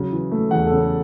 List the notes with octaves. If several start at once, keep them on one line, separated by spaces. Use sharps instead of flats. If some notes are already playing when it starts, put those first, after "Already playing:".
Already playing: C#3 F#3
E3
A3
E2 F#5
C#3 A4
A4